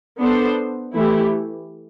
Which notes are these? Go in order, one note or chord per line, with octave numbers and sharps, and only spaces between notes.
B3 D4 A4 C5
E3 A3 E4 G4